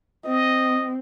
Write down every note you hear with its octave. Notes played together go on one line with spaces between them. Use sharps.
C4 D#5